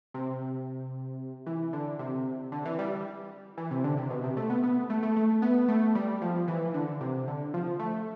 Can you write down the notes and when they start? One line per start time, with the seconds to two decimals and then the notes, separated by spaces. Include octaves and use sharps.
0.14 C3
1.46 E3
1.73 D3
1.99 C3
2.52 D3
2.65 E3
2.79 G3
3.57 E3
3.71 C3
3.84 D3
3.97 C3
4.10 B2
4.24 C3
4.37 A3
4.50 B3
4.63 B3
4.90 A3
5.03 A3
5.16 A3
5.42 B3
5.68 A3
5.95 G3
6.22 F3
6.48 E3
6.74 D3
7.01 C3
7.28 D3
7.54 F3
7.79 A3